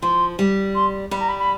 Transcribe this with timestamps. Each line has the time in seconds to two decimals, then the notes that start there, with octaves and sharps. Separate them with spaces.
0.02 F3 C6
0.39 G3
0.75 C6
1.11 G3 B5
1.20 A#5
1.29 B5
1.39 B5